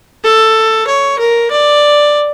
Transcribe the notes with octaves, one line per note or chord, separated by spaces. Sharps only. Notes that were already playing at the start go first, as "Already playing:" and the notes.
A4
C#5
A#4
D5